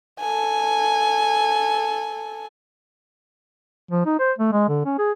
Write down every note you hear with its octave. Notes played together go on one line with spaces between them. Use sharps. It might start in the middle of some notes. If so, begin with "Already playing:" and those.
A4 G#5
F3
D#4
C5
A3
G#3
D3
C#4
G#4